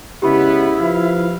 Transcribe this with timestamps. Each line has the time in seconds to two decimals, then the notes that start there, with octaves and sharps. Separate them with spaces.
0.22 C#3 G#3 B3 E4 G4 B5
0.79 F3 B4 F5